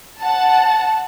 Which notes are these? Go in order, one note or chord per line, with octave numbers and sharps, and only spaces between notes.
F#5 A5